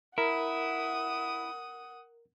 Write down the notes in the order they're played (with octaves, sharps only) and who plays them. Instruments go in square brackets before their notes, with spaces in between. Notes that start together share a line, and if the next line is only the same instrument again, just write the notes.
[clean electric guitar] E4 [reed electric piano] A#4 [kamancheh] F#5 D#6